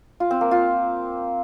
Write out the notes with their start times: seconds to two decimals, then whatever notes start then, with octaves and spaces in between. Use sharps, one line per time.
0.20 F4
0.31 C4
0.41 A#3
0.51 F4